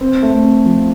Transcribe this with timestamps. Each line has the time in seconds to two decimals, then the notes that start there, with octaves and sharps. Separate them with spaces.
0.01 C4
0.23 A3
0.44 C4
0.66 F3